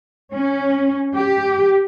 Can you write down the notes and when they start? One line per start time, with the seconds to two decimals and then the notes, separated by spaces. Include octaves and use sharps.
0.34 C#4
1.15 G4